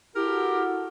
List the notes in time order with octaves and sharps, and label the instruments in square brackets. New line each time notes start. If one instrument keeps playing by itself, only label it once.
[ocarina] E4 [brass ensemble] F#4 A4 [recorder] G4 [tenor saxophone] A#4